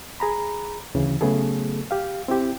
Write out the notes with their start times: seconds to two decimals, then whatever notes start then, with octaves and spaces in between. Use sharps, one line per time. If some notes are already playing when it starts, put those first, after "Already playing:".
0.20 G#4 A#5 B5
0.95 D2 C#3 E3
1.21 C#3 F#3 A3 B3 G#4 A4
1.91 G4 F5
2.28 C4 E4 G4